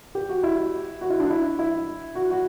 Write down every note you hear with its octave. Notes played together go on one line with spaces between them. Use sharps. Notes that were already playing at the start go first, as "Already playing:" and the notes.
G4
F#4
E4
F#4
E4
D4
E4
E4
F#4
F#4